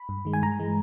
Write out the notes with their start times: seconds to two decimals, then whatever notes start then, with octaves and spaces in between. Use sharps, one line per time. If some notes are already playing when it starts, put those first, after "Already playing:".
Already playing: B5
0.09 G2
0.25 D#3 G#3
0.33 G#5
0.43 G2 A#5
0.60 E3 G#3